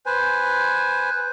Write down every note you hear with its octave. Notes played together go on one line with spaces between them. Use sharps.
B4 C5 G#5